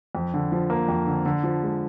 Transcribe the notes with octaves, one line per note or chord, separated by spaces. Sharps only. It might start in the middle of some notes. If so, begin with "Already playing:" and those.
F2
D3
F3
A#3
F2
D3
D3
F3
G#3